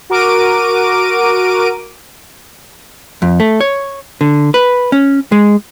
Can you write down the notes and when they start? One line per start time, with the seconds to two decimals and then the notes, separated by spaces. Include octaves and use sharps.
0.10 F#4 A#4 D6 D7 D#7
3.22 F2
3.40 A3
3.61 C#5
4.21 D3
4.54 B4
4.92 C#4
5.32 G#3